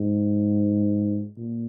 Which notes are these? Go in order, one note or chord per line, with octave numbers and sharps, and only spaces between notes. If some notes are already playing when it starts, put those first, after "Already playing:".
Already playing: G#2
A#2